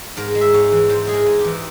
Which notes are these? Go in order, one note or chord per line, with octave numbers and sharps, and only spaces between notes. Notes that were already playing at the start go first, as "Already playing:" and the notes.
G#2 A#4
G#3
E5
G#2 C#5
E3
G#2 C5
G#3 G#4
A#4
G#2
G4
E3